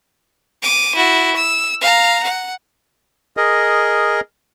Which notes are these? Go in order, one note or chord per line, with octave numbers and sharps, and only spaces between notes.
D6 D#7
E4 F#4
E6
F5 A#5
F#5
G#4 A#4 D#5